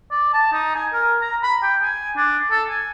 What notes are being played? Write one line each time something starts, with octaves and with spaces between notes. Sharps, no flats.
D5
A5
D#4
G#5
A#4
A#5
B5
G5
G#5
D4
A4
G#5